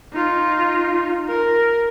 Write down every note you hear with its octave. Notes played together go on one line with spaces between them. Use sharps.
D#4 F4
A#4